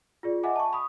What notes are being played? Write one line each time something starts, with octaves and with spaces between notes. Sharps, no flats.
F4 G#4 D5
D#5 E5 F#5 G#5 D6
A5 C#6
B5 D#6